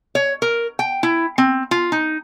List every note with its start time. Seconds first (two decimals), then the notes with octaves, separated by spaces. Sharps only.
0.15 C#5
0.42 A#4
0.79 G5
1.03 E4
1.38 C4
1.71 F4
1.92 D#4